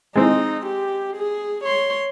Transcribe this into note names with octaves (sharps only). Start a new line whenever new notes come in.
G#3 C4 D#4
G4
G#4
C#5 C6